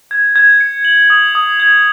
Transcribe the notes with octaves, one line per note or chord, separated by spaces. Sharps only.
G#6
G#6
C#7
F#7
D#6
D#6
G#6